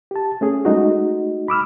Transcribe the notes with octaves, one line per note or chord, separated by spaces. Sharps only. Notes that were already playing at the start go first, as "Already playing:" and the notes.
G4 A5
A3 C#4 G#4
G#3 A3 D#4 F#4
B5 D6 E6 F6